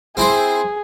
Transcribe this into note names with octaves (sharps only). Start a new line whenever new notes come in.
C4 E4 G#4 C5